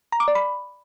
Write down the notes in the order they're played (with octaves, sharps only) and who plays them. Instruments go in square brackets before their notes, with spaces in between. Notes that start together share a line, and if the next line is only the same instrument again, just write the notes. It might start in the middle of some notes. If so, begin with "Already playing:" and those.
[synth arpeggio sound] A#5
D6
D5
B5